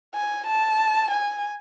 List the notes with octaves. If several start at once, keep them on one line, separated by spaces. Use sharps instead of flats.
G#5
A5
G#5